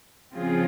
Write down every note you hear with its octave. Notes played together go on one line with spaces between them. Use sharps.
C#3 F3 C4 F4 G#4